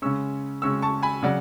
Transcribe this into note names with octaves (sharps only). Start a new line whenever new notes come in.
C#3 G#3 C#4 C#6 E6
C#3 G#3 C#4 C#6 E6
A5 C#6
G#5 B5
C#3 F#3 D5 F#5